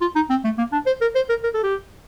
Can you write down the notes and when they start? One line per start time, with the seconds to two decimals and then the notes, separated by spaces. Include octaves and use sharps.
0.01 F4
0.16 D#4
0.30 C4
0.44 A3
0.58 A#3
0.73 D4
0.87 C5
1.01 A#4
1.16 C5
1.29 A#4
1.44 A#4
1.54 A4
1.63 G4